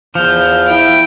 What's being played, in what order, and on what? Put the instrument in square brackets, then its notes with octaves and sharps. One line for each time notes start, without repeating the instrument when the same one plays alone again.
[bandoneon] E2 F6 [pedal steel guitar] F3 [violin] G6
[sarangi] E4 [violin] G5